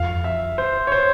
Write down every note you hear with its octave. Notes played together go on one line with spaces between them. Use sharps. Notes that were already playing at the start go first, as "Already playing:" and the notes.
Already playing: F2 F5
E5
C5
C#5
C5